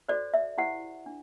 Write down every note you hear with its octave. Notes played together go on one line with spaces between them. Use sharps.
F#4 A4 C5 D5
E5
E4 G4 C5 F#5
D4